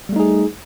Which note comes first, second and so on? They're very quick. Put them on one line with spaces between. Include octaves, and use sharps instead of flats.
G3 A3 D#4 G#4